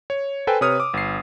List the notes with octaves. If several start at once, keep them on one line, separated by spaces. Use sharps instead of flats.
C#5
A4 B4 C5 G5 G#5
C3 B4 C#5 D#6 F6 D#7
D6
G1 C7